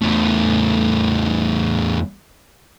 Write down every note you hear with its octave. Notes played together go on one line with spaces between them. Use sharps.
E2 A3